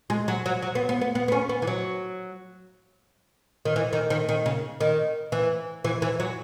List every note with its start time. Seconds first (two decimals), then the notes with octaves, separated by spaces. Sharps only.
0.10 G#3
0.28 F#3
0.46 F#3
0.62 F#3
0.75 B3
0.89 B3
1.01 B3
1.15 B3
1.28 B3
1.32 C#4
1.49 B3
1.62 E3
1.67 F#3
3.65 D#3
3.76 E3
3.93 D#3
4.10 D#3
4.29 D#3
4.46 C#3
4.80 D#3
5.32 E3
5.84 E3
6.02 E3
6.20 F#3